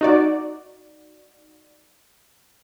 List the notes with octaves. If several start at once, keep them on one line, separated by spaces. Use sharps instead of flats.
D#4 F#4 D5